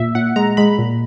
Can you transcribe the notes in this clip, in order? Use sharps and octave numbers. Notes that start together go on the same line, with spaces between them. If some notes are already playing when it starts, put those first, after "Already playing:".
Already playing: A#2 E5
A#2 F#5
G#3 A#5
G#3 B5
A#2